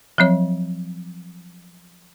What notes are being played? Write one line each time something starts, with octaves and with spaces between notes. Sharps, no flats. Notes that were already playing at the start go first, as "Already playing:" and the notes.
F3 F#3 C4 C#5